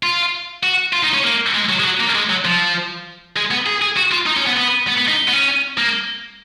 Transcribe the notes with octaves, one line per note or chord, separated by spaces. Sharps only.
F4
F#4
F4
D#4
C#4
A#3
G#3
F#3
G#3
F#3
A#3
G#3
F#3
F3
G#3
B3
G#4
G#4
F#4
F4
D#4
C#4
B3
B3
B3
B3
D#4
B3
C#4
A#3